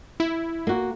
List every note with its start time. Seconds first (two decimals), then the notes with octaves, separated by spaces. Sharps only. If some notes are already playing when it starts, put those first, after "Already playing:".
0.20 E4
0.67 A#3 F#4